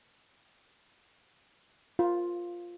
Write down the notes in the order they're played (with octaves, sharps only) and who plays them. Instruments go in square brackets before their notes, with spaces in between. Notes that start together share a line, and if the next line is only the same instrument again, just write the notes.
[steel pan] F4